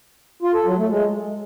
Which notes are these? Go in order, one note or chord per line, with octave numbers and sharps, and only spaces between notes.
F4
A4
F#3
A3
G#3